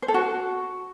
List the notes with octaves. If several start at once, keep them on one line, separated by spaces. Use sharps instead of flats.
C5
A4
F#4